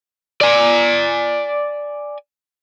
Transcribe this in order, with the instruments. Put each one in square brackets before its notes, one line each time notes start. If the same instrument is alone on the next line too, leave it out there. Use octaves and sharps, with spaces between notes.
[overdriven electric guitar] D5 G#5